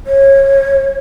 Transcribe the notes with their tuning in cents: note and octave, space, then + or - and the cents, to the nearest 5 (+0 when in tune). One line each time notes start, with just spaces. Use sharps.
C#5 -25